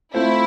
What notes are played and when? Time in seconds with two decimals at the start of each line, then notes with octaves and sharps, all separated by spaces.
0.14 A3 C4 E4 F4 C5